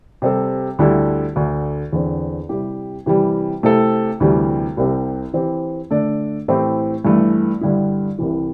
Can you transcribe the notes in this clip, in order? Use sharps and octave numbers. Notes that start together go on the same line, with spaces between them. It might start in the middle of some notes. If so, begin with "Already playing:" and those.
C3 G3 C4 A4
D2 D3 G3 E4 A4
D2 D3 A3
E2 D3 C4
C3 G3 E4 G4
C3 E3 G3
C3 A3 C4 E4 A4
D2 C3 E3 G3
C2 C3 G3 C4 G4
E3 C4 G4
D3 A3 D4 A4 D5
A2 E3 A3 C4 G4
G2 E3 A3
G2 D3 G3 E4
C2 C3 E3